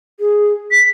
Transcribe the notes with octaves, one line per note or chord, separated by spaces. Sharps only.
G#4
B6